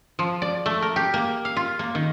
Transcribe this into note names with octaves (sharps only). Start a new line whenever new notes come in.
F3
D5
A3
A#4
G4
A#3
F5
F4
A#3
D#3